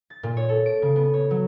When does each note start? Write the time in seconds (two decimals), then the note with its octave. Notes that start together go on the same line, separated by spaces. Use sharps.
0.10 A6
0.23 A#2
0.37 C#5
0.49 A4
0.66 D7
0.82 C#3
0.96 B3
1.14 C#5
1.31 F#3